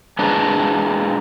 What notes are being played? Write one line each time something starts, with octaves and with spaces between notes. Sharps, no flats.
G#3 D4 G#4 A#4 B4 D5